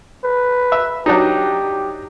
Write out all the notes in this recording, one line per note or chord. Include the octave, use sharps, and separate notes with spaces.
B4
E5
F#3 D4 D#4 G4